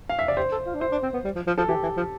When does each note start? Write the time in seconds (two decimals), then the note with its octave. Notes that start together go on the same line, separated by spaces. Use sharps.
0.09 F5
0.19 E5
0.28 D5
0.37 G4 C5
0.52 A4
0.66 F4
0.74 D4
0.81 E4 C5
0.91 D4
1.03 C4
1.13 B3
1.25 G3
1.35 F3
1.47 F3
1.58 F3 A4
1.68 E3 G4
1.83 E3
1.97 F3